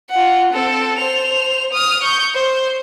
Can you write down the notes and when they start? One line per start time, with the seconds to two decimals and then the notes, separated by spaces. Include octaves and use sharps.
0.11 F4 F#5
0.53 C4 A4
0.98 C5 F7
1.73 D#6 F6
2.03 C#6 G6
2.35 C5